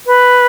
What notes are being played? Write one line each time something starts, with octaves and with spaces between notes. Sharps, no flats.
B4